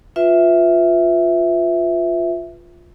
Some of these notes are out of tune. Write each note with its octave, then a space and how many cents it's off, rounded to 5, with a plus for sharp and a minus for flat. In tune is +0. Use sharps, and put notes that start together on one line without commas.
F4 +5 B4 +0 E5 +0